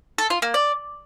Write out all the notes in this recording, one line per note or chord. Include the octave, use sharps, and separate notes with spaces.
A4
F4
A#3
D5